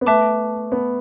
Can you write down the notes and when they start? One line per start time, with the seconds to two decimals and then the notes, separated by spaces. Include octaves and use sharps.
0.01 B3
0.07 A3 B4 E5 A5 D6
0.72 B3